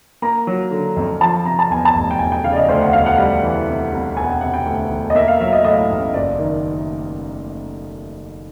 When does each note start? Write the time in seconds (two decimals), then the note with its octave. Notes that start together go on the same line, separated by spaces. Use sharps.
0.22 A#3 A#5
0.47 F#3
0.71 D3
0.97 F2
1.21 F3 A5
1.45 C3 A#5
1.59 A5
1.70 E2 G#5
1.85 A5
1.95 F1
2.11 G5
2.19 E1 G#5
2.32 G5
2.44 C#3 F5
2.52 D5
2.56 D#5
2.69 D2 C5
2.81 F#5
2.93 E1 F5
3.06 F#5
3.18 G3
3.43 E3
3.68 C3
3.92 C2
4.17 E1 G#5
4.24 F#5
4.29 G5
4.41 C3 F#5
4.54 G5
4.66 D2
4.91 E1
5.10 D#5
5.15 A#3 E5
5.28 F5
5.40 F#3 E5
5.53 D#5
5.64 A2 D#5
5.90 A1
6.13 F#1 D5
6.39 D#3